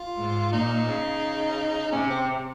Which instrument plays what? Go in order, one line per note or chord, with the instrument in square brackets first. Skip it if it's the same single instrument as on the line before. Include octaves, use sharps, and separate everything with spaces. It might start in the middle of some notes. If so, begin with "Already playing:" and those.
Already playing: [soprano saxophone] F4
[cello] G#2
[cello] A#2 [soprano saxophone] D#4
[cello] C#3
[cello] C3 [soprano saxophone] C#4
[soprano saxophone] C4